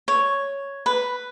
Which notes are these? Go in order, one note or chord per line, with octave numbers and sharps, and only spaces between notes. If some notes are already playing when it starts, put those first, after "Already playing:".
C#5
B4